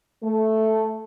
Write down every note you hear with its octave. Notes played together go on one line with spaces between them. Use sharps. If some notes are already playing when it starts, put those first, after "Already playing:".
A3